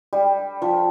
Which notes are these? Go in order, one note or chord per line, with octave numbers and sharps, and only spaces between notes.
G3
F3